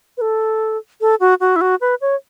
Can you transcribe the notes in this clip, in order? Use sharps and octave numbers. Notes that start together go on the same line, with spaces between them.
B4
A4
A4
F#4
F#4
E4
F#4
B4
C#5